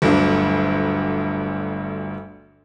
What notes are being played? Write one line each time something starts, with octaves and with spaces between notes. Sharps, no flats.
G1 D2 F#3 D4